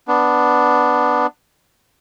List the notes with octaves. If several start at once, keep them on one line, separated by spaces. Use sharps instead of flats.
B3 D4